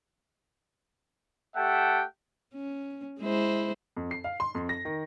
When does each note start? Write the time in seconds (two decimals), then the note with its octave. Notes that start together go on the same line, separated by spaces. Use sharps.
1.56 A3 G4 E5 F#5 G5 A5
2.54 C#4
3.20 G#3 E4 C5
3.97 F2
4.11 C7
4.24 F5
4.40 C6
4.55 F2
4.69 A#6
4.85 D#3